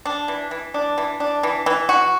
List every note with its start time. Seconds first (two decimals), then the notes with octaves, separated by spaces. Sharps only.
0.05 D4
0.28 E3
0.51 E3
0.74 D4
0.98 E3
1.20 D4
1.43 E3
1.66 E3
1.89 F#4